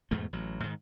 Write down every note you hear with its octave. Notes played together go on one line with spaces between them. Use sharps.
E2 G#2 B2 A3
A1 F#3
G#2 D#3